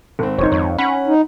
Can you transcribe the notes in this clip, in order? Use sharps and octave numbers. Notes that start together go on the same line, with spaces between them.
G#1 C4
F1 D#4 C5 C#5
F2 C#5
C#4 F#5 B5
D#4